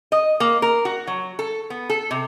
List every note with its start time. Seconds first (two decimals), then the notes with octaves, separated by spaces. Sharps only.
0.12 D#5
0.40 A#3
0.62 A#4
0.85 F#4
1.07 F#3
1.39 A4
1.70 B3
1.90 A4
2.11 C3